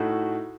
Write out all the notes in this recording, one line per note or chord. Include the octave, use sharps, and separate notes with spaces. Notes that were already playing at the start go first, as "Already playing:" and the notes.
Already playing: A2 A3 D#4 F#4